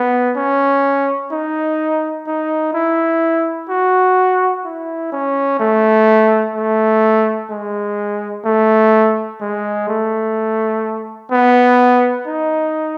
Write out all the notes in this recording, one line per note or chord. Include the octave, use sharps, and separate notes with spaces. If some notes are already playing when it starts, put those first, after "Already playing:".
Already playing: B3
C#4
D#4
D#4
E4
F#4
E4
C#4
A3
A3
G#3
A3
G#3
A3
B3
D#4